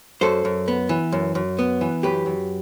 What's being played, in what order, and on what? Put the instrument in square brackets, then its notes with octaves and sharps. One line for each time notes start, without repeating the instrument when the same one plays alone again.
[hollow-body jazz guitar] F#2 A4 C5
F#2
B3
E3
F#2
F#2
B3
E3
F#2 G4 B4
F#2